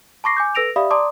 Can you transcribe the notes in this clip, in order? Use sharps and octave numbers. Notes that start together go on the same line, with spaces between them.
A5 B5 C#6 D6 A#6 C7
G#5 D6 G6
A4 B4 E6 A#6 D7 F7
G4 D5 E5 F5 B5 D#6
D5 A5 A#5 C6 D6 D#6